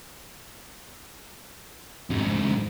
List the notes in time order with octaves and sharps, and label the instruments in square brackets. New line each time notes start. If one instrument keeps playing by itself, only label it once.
[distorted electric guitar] F2 G#2